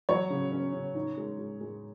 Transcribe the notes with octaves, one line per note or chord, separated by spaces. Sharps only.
F#3 C#5
C#3
C#4
C#3
D#4
G#3
G#3
G#3